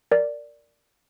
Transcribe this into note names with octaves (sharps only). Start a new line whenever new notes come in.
A#4 D5